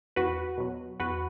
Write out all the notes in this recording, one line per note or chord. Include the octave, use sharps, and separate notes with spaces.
E2 F#4 B4
B2 F#3
E2 F#4 B4